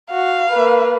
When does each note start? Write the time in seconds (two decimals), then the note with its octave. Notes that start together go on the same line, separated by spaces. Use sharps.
0.11 F#4 F5
0.50 A#3 B4